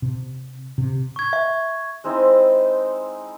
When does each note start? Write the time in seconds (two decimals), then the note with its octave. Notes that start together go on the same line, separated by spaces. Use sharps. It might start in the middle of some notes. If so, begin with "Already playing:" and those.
0.02 C3
0.78 C3
1.16 C#6 G#6
1.33 E5
2.04 G#3 C4 D#4 E4